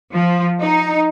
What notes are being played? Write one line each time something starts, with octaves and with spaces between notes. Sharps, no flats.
F3
D#4